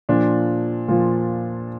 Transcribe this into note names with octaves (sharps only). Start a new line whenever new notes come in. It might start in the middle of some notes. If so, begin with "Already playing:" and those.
A#2 F3 D4
A#2 F3